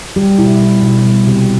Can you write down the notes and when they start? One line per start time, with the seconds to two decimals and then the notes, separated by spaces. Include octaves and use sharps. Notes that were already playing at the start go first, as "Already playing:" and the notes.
0.16 G3 G4
0.38 B2 E4
0.61 G3
0.83 B2
1.05 G3
1.27 C3 G4